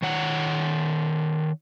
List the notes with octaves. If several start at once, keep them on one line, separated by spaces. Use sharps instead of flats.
D#3 C#5 F#5